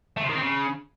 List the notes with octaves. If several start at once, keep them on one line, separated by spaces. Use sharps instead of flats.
A3
C3
D#3
C4
C#3